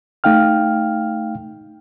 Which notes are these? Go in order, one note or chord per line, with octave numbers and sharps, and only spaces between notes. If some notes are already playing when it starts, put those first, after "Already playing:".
A3 D#4 F5 G5 F6